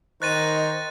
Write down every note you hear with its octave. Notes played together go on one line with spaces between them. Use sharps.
D#3 C5 D#5 A#5 C#6 F#6 A6 D#7